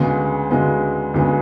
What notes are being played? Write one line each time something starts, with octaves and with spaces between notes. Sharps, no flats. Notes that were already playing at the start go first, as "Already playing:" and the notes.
Already playing: D2 C#3 G#3 B3
D2 C#3 G#3 B3
D2 C#3 G#3 B3